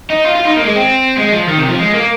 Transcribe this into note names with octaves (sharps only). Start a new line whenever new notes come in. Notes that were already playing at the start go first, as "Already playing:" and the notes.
D#4
F4
F4
D#4
A#3
G#3
C4
G#3
F3
D#3
C3
F3
G#3
A#3